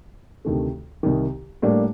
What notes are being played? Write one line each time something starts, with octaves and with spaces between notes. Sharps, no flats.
D2 C3 D#3 A3
C2 C3 D#3
A2 G3 A#3 D4